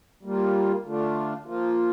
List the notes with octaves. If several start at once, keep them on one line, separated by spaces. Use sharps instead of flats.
G3 A#3 F4
D3 A3 D4 F4
F3 A#3 F4